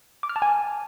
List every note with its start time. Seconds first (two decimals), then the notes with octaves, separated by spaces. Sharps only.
0.23 D6
0.29 F6
0.36 A5
0.42 G#5